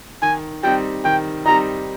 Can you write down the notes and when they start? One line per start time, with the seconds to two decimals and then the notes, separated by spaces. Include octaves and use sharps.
0.22 D#3 G#5
0.63 G3 C4 D#4 G5
1.05 D#3 G5
1.46 G3 C4 D#4 A#5